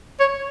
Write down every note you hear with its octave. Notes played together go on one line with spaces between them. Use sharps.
C#5